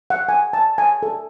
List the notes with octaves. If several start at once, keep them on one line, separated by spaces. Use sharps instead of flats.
F#5
G#5
A5
G#5
A4